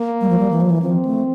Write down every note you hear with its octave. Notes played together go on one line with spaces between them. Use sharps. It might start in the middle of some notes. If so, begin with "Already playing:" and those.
Already playing: A#3
G3
F3
G3
E3
F3
E3
F3 C4
A3